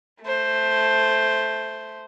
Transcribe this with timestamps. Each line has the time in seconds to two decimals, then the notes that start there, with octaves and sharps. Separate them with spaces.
0.22 A3 C5